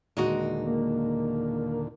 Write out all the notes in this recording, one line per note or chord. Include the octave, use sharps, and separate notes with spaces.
D#2 A#2 D3 G#3 D#4 F#4
A#3